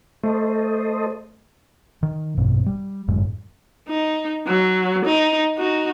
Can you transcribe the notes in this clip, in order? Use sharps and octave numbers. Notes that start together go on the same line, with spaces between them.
A3 A4 C5 D#5
D#3
A#1 G2 B2 C4
G3
G1 F#2 A2 G#3
D#4
F#3
D#4
D#4 F#4